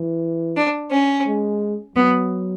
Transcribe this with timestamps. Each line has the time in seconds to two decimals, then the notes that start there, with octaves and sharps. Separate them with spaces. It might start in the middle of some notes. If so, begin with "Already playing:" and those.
Already playing: E3
0.57 D4
0.92 C#4
1.27 G#3
1.96 F#3 B3